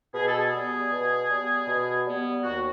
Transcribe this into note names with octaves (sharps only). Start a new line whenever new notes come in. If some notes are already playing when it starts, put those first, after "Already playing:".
B2 G#4
A4
G#4
G3 B3
B2
G3 B3
B2
G3 B3
D#2 F#4